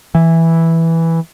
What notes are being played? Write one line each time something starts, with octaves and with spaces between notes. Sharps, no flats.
E3